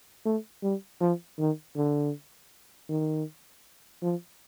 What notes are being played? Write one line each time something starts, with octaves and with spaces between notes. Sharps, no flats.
A3
G3
F3
D#3
D3
D#3
F3